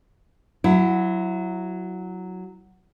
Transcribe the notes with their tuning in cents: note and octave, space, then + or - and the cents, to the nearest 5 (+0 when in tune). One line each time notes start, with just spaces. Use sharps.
F#3 +0 E4 +20